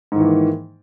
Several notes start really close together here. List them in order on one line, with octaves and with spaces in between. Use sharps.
G#2 D#3 E3 A#3